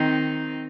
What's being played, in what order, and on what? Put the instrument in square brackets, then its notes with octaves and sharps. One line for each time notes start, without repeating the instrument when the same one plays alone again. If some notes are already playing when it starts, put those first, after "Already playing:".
Already playing: [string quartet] D#3 C4 D#4